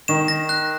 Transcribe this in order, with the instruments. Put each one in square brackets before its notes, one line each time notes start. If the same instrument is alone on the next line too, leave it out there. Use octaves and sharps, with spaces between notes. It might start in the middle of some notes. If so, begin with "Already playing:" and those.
[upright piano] D#3 [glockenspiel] E7
[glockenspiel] A#6
F#6